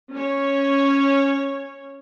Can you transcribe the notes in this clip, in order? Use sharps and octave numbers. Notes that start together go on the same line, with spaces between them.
C#4 C#5